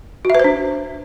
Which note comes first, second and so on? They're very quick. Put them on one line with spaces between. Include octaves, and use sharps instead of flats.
F#4 E5 B4 C5 D4